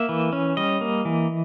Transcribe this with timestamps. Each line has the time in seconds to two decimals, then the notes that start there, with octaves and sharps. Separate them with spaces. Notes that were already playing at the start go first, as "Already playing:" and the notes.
Already playing: A#3 E5
0.09 E3
0.33 C#4
0.57 G3 D#5
0.81 A#3
1.05 E3